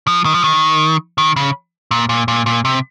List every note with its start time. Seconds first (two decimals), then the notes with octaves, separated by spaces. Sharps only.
0.07 F3
0.25 D#3
0.34 F3
0.44 D#3
1.18 D#3
1.36 C#3
1.91 A#2
2.09 A#2
2.28 A#2
2.46 A#2
2.65 C3